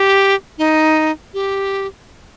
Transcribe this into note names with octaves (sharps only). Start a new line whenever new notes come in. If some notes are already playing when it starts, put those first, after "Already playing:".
Already playing: G4
D#4
G4